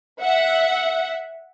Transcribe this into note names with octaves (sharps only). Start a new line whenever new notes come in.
E5 F#5